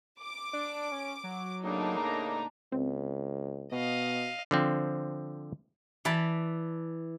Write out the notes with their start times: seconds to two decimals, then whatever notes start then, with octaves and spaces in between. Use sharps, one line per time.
0.21 D6
0.53 D4
0.92 C#4
1.24 F#3
1.65 A2 C#3 A#3 D4 D#4
1.97 A#5
2.72 C#2 C4
3.72 B2 D#5 F5
4.51 D3 F3 C4
6.05 E3 D5 A5 B5